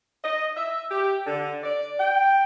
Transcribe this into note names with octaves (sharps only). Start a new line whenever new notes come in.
D#5
E5
G4
D3
D5
G5